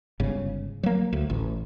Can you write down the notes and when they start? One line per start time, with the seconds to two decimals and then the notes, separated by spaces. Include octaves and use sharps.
0.20 G1 G#2 C#3
0.83 F#3 A#3
1.13 D2
1.30 A1